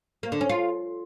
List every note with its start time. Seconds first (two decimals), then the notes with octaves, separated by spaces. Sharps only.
0.23 A#3
0.32 D3
0.41 C#4
0.49 F4